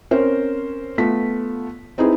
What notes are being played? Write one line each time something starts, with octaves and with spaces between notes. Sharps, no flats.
C4 C#4 A#4 C5
A3 B3 F4 B6
C4 D#4 E4 G#4 B4